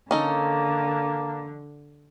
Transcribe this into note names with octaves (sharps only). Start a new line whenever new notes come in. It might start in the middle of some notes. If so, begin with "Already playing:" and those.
D3 A#3 C#4 D#4 A4